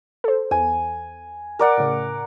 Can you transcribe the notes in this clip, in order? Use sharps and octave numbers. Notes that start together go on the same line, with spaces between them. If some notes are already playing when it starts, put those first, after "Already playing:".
A4 C5
E2 G#5
A#4 D5 F#5
A2 C#3